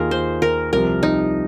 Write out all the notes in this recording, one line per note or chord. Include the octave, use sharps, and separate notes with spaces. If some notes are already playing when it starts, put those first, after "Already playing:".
Already playing: D#2 D#3 A#3 F4 G#4 A#4
C5
A#4
C2 C3 F3 A#4
D#4